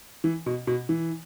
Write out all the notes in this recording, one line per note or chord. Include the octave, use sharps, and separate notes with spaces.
E3
B2
B2
E3